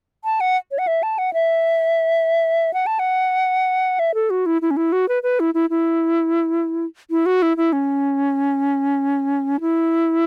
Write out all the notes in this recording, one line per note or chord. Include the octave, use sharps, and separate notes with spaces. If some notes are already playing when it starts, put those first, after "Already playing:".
A5
F#5
C#5
F#5
E5
A5
F#5
E5
F#5
A5
F#5
E5
A4
F#4
E4
E4
C#4
E4
F#4
B4
B4
E4
E4
E4
E4
F#4
E4
E4
C#4
E4